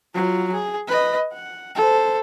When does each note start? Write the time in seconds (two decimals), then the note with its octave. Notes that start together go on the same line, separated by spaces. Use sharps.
0.15 F#3 F4
0.52 G#4
0.88 B4 D#5
1.33 F#5
1.75 A4 C5